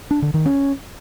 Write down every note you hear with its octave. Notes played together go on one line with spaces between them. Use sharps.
D4
D3
D#3
C#4